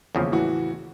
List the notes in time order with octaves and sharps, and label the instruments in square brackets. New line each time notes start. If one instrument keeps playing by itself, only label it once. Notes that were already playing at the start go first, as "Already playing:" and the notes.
[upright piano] D#1 G#3 [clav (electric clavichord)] E2 C#3 F3
[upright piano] A2 E3 F#4